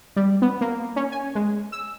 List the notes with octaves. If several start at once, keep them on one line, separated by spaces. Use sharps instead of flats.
G3
B3
A#3
C#4
G#5
G#3
E6